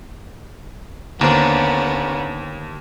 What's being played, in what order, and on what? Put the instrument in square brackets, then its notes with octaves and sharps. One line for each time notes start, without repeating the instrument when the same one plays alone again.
[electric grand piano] D#2 [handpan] D3 C5 [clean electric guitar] A#3 D4 [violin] B3 C#4